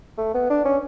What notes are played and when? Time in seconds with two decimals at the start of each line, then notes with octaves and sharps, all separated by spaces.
0.18 A3
0.34 B3
0.50 D4
0.65 C#4